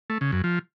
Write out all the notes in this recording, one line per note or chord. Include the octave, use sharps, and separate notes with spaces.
A3
C#3
F#2
F3